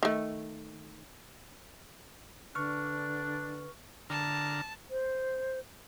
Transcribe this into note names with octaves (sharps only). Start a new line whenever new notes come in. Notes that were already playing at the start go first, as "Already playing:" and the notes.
D#3 A3
D3 D4 B4 C#6 F6
D3 A5 A#5 F6
C5